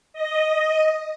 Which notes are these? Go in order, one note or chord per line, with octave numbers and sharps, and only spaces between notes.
D#5